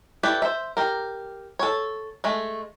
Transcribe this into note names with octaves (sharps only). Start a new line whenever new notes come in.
E4 G4 A4 B4 D5
C5 E5
G4 A#4
A4 C#5
G#3 A3